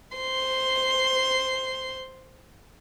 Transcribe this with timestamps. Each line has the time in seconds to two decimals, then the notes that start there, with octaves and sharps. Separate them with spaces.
0.17 C5 C6